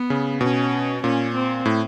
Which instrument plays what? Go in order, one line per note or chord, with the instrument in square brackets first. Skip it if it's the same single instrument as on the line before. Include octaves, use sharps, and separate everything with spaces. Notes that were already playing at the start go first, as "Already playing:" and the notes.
Already playing: [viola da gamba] B3
[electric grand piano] C#3
[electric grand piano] B2 [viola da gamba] C#4
[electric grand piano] A#2 [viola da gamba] C#4
[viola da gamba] C4
[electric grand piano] A2